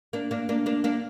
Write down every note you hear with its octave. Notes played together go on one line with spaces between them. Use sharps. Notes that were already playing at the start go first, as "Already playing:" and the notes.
A#3 D4
A#3 D4
A#3 D4
A#3 D4
A#3 D4